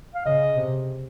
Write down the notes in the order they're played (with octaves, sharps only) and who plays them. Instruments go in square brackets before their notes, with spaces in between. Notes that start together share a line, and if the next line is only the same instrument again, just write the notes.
[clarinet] F5
[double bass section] C#3 [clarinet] D#5
[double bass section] C3